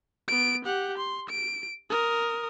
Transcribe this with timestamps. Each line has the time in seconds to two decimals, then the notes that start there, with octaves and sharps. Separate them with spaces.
0.28 B3 D7
0.65 G4 F#5
0.98 C6
1.29 D7
1.90 A#4 D#6